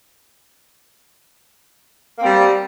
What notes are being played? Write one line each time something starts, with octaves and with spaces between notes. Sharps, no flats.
G3 A#3 C4